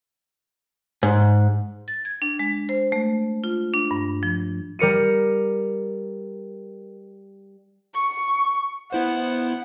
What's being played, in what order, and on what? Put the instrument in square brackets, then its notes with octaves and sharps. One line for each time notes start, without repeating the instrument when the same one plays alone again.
[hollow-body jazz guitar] G#2
[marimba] A6
G#6
D4
G#3
C5
A3
F4
D4
G2
F3
[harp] G3 A#4 C#7 D#7
[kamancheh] C#6
[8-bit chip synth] B3 E4 C5 [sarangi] F#5